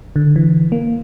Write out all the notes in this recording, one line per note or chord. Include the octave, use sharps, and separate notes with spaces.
D3
E3
A#3